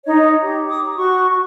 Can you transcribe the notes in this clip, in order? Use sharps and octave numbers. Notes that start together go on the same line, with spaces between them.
D#4 C#5 D#5
G4
D6 D#6
A#5
F#4 C#6